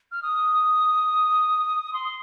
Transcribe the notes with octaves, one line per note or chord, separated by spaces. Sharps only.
F6
D#6
C6